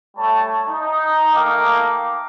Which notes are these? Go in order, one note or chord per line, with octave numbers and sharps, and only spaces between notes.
G3 A3 C#5 A5
D#4
A3 A#3 D#4 F5 G5 D6